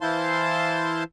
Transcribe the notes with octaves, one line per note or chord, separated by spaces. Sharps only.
E3 E4 C5 F5 A5 C6